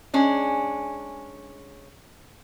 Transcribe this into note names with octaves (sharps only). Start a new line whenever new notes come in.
G#3 C#4 D4